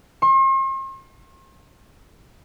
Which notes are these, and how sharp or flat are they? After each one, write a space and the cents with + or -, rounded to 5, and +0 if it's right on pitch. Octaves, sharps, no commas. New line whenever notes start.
C6 +45